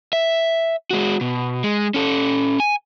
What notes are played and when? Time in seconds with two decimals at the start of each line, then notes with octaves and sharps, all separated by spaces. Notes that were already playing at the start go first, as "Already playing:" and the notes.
0.13 E5
0.91 G#3 F#4
1.21 B2
1.64 G#3
1.94 C#4 A4
2.60 G#5